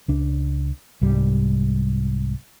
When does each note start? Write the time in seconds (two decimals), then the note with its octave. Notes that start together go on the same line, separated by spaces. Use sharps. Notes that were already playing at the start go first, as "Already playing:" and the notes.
0.08 C#2 D4
1.01 C2 G#2 G3